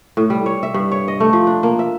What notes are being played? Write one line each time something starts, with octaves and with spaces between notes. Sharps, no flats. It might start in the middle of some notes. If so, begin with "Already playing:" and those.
A2
G3
C#5
E5
G2
C#5
D#5
A3
F3
D4
A#3
E5